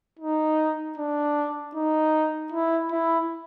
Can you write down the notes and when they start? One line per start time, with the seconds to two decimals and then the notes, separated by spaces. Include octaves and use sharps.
0.19 D#4
0.98 D4
1.75 D#4
2.52 E4
2.91 E4